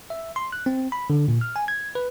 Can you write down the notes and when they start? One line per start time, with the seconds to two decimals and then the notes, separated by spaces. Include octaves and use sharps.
0.10 E5
0.36 C6
0.53 F#6
0.66 C4
0.92 B5
1.10 D3
1.28 A#2
1.41 F6
1.56 G#5
1.68 G#6
1.95 B4